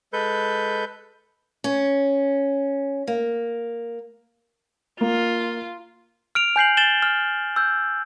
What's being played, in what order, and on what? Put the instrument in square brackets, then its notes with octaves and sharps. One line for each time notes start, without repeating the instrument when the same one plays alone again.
[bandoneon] G#3 A4 B4 G6
[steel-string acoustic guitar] C#4
A#3
[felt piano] A#3 [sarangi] F4
[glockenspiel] F6 D7 F7
G#5 G6 C7 F#7
A6 E7 F#7 G7
F6
E6 G6